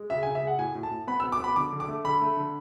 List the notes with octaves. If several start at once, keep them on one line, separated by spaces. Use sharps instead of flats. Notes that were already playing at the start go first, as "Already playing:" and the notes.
Already playing: G#3
C#3 E5
G#5
C#3
E5
G#3 F#5
A2 G#5
A2
A5
A2
B3 B5
B3 E6
D6
B3 B5
D3 D6
D3
D6
A3
D3 B5
A3
D3